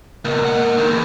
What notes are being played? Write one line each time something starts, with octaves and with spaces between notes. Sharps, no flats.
C#2 B2 A#3
G#3 F#5
D3 D#3
E2